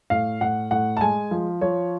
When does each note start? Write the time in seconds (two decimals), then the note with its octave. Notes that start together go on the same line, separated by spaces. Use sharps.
0.10 A2 F5
0.41 A2 F#5
0.71 A2 F#5
0.97 A5
1.01 G#3 G#5
1.31 F3
1.61 F3 C#5